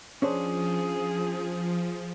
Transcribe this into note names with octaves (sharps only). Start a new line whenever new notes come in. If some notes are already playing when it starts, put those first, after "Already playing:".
F3 C#4 D4 G#4 C5